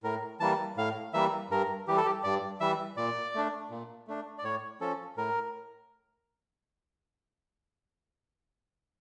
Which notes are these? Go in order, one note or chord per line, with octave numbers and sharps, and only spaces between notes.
A2 A#4
E3 G3 A#3 A5
A2 F5
E3 G3 A#3 E5
G2 A#4
E3 G3 G4
A4
G4
G2 D5
E3 G3 E5
A#2 D5
A3 D4
A#2
A3 D4
D5
A2 C#5
F3 C#4 A4
A2 A#4